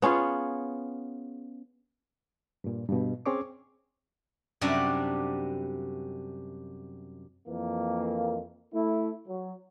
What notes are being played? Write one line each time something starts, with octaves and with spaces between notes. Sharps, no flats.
B3 C#4 F4 G#4
G2 A#2
G2 B2
C4 C#4 G#4 C#5 C#6 D6
F#2 C3 G3 D4 F#4 D5
F2 E3 A#3
A3 E4
F#3